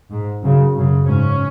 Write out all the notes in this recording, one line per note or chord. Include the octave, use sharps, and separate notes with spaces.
G#2
F#2 C#3
F#2 C#3
G#2 C#4